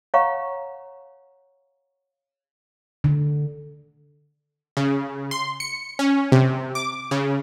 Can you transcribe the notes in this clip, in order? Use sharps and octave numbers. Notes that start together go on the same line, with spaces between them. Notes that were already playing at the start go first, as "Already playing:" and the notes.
C#5 F5 F#5 A#5 C#6
D3
C#3
C6
C#7
C#4
C3
D6
C#3